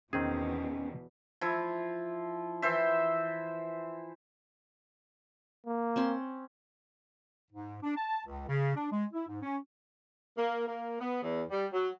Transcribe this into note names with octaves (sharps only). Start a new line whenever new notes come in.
E2 B2 D#3 C4 C#4 G#4
F3 E4
E3 C5 E5
A#3
C4 C#4 C6
G#2
D4
A5
C#2
C#3
D4
G#3
E4
G#2
C#4
A#3
A#3
B3
E2
G3
F#3